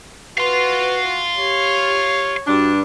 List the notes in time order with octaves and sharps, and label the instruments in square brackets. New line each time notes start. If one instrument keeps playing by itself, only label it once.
[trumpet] F#4 [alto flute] B4 [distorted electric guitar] F5 C6
[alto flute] G4 [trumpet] C#5
[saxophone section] G2 D4 [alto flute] F#4